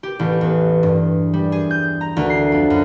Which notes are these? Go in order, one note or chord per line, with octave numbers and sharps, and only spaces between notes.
G4
A1
E2
G2
G3
G#4
G6
A#5
D2
C7
F2
F#2